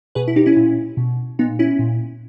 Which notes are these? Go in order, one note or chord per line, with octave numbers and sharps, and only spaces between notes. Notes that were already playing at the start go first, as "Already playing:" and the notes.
B2 G#4 B4
E4
D#4 G4
C#4 E4
A#2
B2
A#2 B3 D#4
C#4 E4
A#2